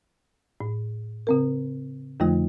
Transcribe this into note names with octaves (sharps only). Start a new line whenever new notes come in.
A2
C#3 C4 A#4
F2 D3 F3 A3 F4